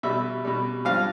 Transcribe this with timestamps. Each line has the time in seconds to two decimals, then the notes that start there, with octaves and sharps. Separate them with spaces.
0.03 B2 G3 E5
0.45 B2 G3
0.85 G2 F3 F5